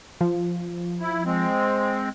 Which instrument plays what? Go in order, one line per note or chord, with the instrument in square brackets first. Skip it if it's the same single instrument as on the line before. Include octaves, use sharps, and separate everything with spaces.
[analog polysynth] F3
[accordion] E4
G#3 C4